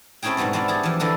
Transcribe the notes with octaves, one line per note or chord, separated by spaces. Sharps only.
A3 C4 C#4 E4 G#4 G5
G#2 B2 G3 B3 C4
B3 C4 D4 E4 D5 F5
G4 G#4 A5
E3 F3
D3 E3 G3 A4 B4